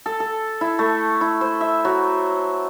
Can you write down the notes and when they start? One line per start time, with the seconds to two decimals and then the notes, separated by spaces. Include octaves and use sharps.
0.06 A4
0.20 A4
0.61 E4
0.79 A3
1.21 E4
1.41 C5
1.61 E5
1.85 F#3